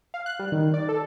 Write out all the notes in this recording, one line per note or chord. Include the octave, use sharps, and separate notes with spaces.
F5
F#6
G3
D#3
D5
A4